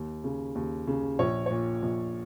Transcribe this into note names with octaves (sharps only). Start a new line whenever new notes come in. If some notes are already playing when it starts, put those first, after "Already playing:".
Already playing: D#2
C#3
D#2
C#3
A#1 C#5
A#2 C#5
A#1